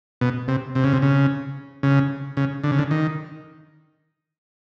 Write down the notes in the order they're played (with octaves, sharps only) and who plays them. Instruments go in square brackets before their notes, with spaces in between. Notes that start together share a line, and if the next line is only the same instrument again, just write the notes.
[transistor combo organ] B2
C3
C3
C#3
C3
C#3
C#3
C#3
D3
C#3
D3
D#3